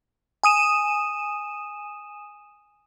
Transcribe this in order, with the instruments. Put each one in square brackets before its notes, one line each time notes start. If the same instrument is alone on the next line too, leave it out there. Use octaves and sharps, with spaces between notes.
[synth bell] G#5 D#6 D#7 E7